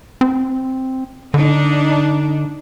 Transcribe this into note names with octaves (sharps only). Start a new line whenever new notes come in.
C4
D3 D4 D#4